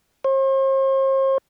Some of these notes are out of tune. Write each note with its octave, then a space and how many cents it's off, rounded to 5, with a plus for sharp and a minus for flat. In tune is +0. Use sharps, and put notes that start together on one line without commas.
C5 +45